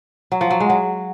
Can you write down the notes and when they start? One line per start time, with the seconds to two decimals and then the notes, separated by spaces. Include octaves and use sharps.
0.32 F#3
0.41 F3
0.50 F#3
0.60 G#3
0.70 F#3